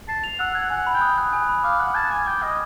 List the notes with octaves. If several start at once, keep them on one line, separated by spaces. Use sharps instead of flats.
A5 C7
F7
F#5 E6
F#5 G#6
F#5 G#5
B5
G5
D#6
F#6
G#5
B5
F5 D6
F#5 F6
A5 G#6
G#5 D6
G5 D6
D#5 F6